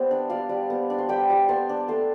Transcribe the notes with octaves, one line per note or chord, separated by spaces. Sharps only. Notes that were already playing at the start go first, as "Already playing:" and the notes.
Already playing: G3 B3 C5 D5 E5
D4
G3 D5 F5
G3
B3
D4
C6
G3 G5 B5
G3
B3 A5 C6
D4
A3 A5 C6